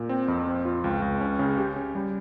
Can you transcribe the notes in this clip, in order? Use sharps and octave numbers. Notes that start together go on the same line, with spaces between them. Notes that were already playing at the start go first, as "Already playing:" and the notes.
Already playing: A#2
C4
F2
C4
F4
C#2
C#2
C#4
C#3
G4
C#4
G3